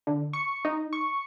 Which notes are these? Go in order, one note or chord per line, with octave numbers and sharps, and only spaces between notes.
D3
C#6
D#4
C#6